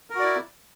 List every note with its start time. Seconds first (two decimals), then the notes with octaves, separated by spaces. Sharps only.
0.10 A#4
0.15 F#4
0.19 D5
0.24 E4